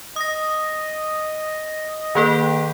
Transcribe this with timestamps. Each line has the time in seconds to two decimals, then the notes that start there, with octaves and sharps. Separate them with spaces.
0.16 D#5 D#6 A#6
2.15 D#3 A#3 A4 B4 G5